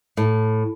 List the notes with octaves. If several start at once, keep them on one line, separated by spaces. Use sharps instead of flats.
A2